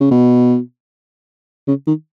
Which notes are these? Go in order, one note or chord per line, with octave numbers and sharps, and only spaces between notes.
C#3
B2
C#3
D#3